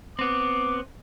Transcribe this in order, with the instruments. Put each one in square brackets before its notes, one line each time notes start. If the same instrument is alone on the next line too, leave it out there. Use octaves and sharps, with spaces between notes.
[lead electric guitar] B3 C4 [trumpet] D6